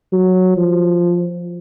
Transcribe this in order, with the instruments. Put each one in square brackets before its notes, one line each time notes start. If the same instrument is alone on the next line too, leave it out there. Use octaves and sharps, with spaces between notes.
[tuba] F#3
F3